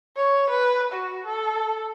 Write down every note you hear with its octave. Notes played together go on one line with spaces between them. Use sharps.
C#5
B4
F#4
A4